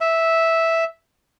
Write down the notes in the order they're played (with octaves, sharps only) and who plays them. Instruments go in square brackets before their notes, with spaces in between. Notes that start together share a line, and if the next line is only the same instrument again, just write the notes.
[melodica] E5